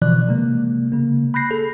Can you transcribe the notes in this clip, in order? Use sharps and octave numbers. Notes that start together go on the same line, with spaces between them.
B2 D3 E3 F3 D5 F#6
C3 G#3 A#3
C#3 A#3
B5 F#6 G6 A#6 C7
G#4 A4